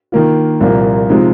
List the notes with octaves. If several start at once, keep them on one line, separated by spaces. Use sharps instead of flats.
D#3 A#3 F4
C2 A#2 F3 A#3
C3 F3 G#3 D#4